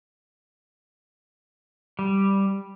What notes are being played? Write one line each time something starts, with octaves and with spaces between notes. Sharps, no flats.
G3